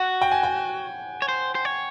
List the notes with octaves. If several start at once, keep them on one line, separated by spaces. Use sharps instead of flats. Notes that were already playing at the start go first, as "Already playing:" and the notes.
Already playing: F#4 F#5
G5
G#5
G5
C#5
C5
C5
C#5